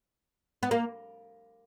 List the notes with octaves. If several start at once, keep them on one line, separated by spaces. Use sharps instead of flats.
B3
A#3